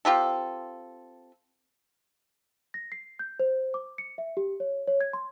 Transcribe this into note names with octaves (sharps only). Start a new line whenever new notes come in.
C4 F4 G4 A4
A#6
C7
G6
C5
D6
C#7
E5
G4
C#5
C#5
G#6
C6